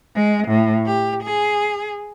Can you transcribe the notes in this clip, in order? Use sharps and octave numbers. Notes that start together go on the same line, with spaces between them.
G#3
A2
G4
G#4